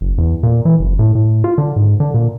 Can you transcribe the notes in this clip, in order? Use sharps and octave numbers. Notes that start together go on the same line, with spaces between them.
F#1
E2
A#2
E3
F#1
A2
A2
F4
D3
G#2
D3
A#2